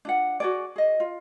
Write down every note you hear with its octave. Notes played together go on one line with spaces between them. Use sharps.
D4 F4 F#5
F#4 G#4 D5
G#4 D#5
F4